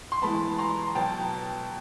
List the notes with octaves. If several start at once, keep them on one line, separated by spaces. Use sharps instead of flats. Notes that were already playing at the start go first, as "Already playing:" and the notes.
C6
E3 G#3 B3 A5 B5
A#5 C6
B2 F#3 B3 G5 A5